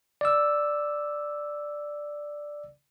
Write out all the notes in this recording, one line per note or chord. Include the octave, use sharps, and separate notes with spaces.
D5 E6